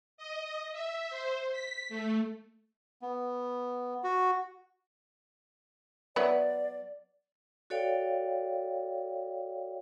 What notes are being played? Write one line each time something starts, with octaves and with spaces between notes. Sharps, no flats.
D#5
E5
C5
B6
A3
B3
F#4
F#3 B3 E4 D5
F#4 A4 C#5 D5 F5 G5